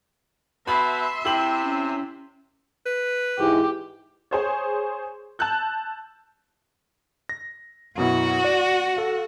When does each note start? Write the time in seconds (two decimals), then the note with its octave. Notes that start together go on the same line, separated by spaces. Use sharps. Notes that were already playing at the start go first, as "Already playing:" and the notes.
0.67 B2 E5 B5 C6
1.25 C3 E4 G4 F#7
1.62 C#4
2.86 B4
3.38 G#2 E3 G4
4.31 G#4 C5 C#5
5.39 A5 E6 F#6 G6
7.29 A#6
7.98 F#2 B2 E4 F#4 F#5
8.44 D5
8.97 A4 F5